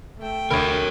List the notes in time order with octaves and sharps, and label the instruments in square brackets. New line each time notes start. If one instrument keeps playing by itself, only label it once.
[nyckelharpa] A3 G5
[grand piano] D2 B5 D7 [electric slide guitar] A#4 C#5